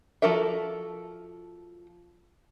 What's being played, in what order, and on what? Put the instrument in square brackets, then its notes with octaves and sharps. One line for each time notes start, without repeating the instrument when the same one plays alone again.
[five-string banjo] F3 F#4 A4 A#4 E5